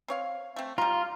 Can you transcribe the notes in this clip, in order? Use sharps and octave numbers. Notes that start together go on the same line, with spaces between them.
C4 C#5 F5
A3 C4
G3 F4 A#5